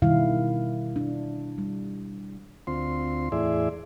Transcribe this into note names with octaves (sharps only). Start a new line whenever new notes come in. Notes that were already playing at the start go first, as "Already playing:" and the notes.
B2 D#3 G3 E4 F5
D4
G3
D2 C4 F4 C6
E2 A2 E4 G#4 D5 E5